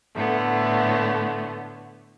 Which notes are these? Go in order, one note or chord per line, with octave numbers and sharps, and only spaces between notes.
A2 D3 A3 B3